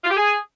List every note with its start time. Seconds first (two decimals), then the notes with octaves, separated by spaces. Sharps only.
0.04 F4
0.10 G4
0.16 G#4